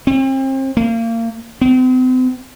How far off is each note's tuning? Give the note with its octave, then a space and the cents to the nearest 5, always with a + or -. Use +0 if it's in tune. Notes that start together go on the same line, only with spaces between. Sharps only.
C4 +35
A#3 -30
C4 -40